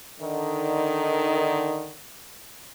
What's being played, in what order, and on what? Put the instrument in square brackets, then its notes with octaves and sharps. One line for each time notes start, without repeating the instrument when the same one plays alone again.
[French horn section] D3 D#3